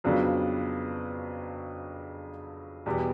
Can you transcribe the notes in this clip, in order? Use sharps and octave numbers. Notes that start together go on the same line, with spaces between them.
F2 C#3 F#3 B3 D4
E2 B2 G3 B3